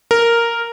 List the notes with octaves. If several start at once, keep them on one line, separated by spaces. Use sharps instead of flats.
A#4